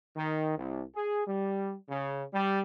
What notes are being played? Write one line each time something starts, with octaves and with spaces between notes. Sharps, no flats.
D#3
C2
G#4
G3
C#3
G3